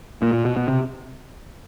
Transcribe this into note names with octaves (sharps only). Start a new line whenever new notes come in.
A#2
A#2
B2
B2
C3